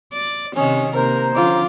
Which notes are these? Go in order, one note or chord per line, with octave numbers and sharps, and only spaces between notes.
D5
C3 D#3 C#4 D#4
C3 A#3 A#4 C5 A#5
D3 F3 C#4 F4 D6